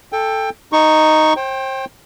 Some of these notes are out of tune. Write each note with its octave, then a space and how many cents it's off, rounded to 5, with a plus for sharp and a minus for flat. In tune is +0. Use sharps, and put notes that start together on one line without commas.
A4 +0 G5 +20
D#4 +0 C#6 +0
C5 +35 G5 +0